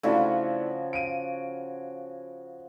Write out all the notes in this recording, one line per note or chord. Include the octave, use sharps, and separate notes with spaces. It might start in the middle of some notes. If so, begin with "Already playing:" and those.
C#3 F3 A3 D4 E4 F#4
D7 D#7